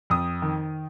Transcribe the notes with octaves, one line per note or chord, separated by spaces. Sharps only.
F2 D#6
D#3